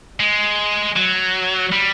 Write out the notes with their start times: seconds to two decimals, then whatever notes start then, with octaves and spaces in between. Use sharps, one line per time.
0.20 G#3
0.96 F#3
1.72 G3